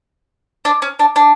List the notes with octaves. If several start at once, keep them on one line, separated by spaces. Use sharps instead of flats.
D4
C#4
D4
D4